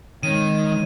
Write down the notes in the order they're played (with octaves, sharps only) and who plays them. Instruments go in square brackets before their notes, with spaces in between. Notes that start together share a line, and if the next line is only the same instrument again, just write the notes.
[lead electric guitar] D#3 [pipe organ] G#3 C4 C#5 [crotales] D#7